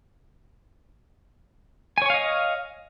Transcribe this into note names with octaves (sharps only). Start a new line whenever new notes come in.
C#5 D#5 F5 G#5 C#6